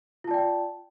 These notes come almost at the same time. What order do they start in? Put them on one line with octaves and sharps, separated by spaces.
F4 A5 D5 G5